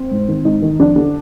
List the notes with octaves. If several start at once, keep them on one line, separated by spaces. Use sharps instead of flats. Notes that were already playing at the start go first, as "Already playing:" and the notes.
Already playing: C4
G#2
D#3
G#2 D#4
D#3
F2 D4
D3